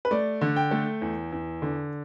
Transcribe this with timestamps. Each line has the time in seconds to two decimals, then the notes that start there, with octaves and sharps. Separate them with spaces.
0.05 B4
0.11 A3 D5
0.41 D3
0.56 G5
0.71 A3
1.02 E2
1.32 E2
1.62 D3